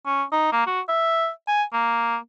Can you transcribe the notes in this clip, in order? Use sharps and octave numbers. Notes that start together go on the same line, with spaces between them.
C#4
D#4
A#3
F#4
E5
G#5
A#3